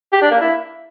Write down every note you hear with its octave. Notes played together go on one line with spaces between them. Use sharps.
G4
D4
A#3
E4